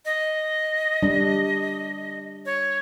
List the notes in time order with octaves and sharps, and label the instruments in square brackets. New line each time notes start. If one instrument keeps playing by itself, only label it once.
[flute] D#5
[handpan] G3 D4
[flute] C#5